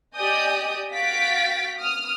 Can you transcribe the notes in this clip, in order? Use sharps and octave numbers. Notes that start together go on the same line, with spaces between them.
G4 D5 D#5 G#5 D#6 G6
F#4 F5 G5 A6 B6 D7
D#6 F6